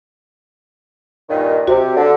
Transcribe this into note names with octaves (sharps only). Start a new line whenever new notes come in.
G2 A#2 D#3
C3 F#4
D3